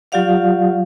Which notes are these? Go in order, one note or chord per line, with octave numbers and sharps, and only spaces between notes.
F#3 F4 G4 D5 F5 F#5